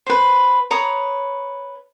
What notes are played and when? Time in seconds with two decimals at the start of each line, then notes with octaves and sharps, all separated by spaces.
0.07 B4 C5
0.71 B4 C#5 A#5 D#6